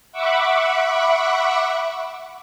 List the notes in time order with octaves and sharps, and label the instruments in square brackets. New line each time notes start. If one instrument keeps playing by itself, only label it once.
[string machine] E5 F#5 B5 C#6 D6